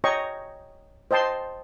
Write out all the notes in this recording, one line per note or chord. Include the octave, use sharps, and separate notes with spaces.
C#5 D#5 G5 A#5 C#6
C5 D#5 G5 A5 C6